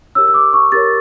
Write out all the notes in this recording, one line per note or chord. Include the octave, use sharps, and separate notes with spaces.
G4 A#4 C#5 E6
E6
D6
C#6
G4 A#4 C#5 A6